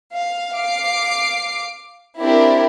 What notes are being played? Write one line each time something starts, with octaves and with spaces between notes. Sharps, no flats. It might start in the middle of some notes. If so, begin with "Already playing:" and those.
F5
F5 D6 C7 D7
C4 D4 E4 G4 A#4 D5